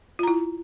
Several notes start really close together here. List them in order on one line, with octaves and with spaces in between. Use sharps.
F4 A#5 E4